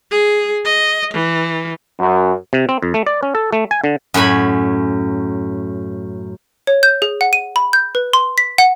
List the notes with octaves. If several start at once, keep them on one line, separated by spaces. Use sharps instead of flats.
G#4
D#5
E3
F#2
C3
C4
F2
A3
D5
C#4
A4
A3
G#5
D3
F#2 A2 C#5 G#5 B5
C#5
G6
G#4
F#5
D#7
B5
G6
B4
C6
B6
F#5